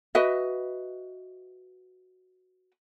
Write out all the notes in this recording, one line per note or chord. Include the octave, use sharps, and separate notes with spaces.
F#4 B4 D#5 E5